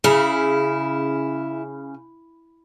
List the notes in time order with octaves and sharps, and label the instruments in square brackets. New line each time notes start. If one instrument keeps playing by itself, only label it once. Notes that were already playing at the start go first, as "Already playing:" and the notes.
[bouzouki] C#3 [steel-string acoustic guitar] E4